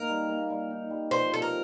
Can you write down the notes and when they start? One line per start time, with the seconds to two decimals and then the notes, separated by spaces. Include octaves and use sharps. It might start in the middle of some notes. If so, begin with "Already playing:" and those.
Already playing: A#3 D#4 A#4
0.09 G3
0.29 A#3
0.50 G3
0.70 D#4
0.90 G3
1.11 F3 C5
1.32 C3 A4
1.42 A#4